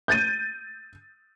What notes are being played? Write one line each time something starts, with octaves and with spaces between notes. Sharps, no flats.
G6 A6 D#7